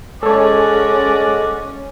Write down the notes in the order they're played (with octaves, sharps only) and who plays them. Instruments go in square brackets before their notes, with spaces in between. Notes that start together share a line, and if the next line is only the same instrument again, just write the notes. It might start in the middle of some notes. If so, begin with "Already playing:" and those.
[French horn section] G#3 [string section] C#4 [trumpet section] F#4 D5 [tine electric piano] A4 C#5